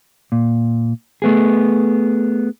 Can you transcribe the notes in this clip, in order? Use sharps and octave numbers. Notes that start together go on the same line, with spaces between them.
A#2
A3 B3 G#4